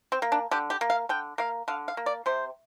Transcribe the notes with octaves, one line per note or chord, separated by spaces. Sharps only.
C4
A#3
D4
D3 G4
G4
A#3
F5
D3 G5
A#3 F5
D3 F5
F5
A#3
D5
C3 C5